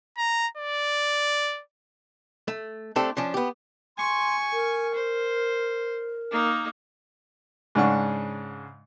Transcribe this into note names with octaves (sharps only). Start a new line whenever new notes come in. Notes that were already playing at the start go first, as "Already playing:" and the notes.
A#5
D5
A3
A3 C4 D4 G4 A4
F3 C#4 D4
B3 G4
G#5 C6 C#6
A#4
C5
A#3 D#4
G#2 C#3 D4 F#5 C#6